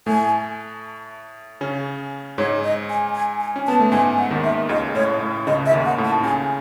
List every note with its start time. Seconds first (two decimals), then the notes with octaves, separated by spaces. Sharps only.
0.06 A2 A3 G#5
1.61 C#3 C#4
2.38 G#2 G#3 C#5
2.64 D#5
2.90 G#5
3.15 G#5
3.41 G#5
3.56 C#4
3.67 B3 A5
3.80 A3
3.92 G#2 G#3 G#5
4.18 F#5
4.31 D#2 D#3
4.44 E5
4.69 C#2 C#3 D#5
4.95 A2 C#5
5.20 A2
5.47 C#2 C#3 D#5
5.66 E5
5.72 D#2 D#3
5.85 F#5
5.98 A2
6.04 A5
6.23 C#2 C#3 G#5